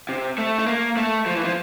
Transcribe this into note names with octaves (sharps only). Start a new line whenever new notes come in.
C3
A3
A3
A#3
A3
F3
E3
F3